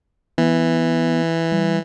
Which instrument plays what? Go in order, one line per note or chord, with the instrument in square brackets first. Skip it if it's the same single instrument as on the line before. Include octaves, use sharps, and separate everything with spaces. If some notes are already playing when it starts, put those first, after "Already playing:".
[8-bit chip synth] E3 [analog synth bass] B3
[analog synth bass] G3